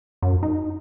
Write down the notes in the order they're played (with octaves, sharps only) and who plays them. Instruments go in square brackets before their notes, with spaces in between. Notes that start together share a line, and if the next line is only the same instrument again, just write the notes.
[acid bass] F#2
D#4